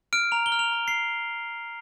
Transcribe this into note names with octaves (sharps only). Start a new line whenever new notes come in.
F6 D7
A#5 F7
G7
F6
F7
A#5
C7